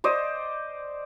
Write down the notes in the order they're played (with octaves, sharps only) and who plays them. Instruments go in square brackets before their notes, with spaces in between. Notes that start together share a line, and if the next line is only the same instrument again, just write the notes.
[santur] C5 D5 D#5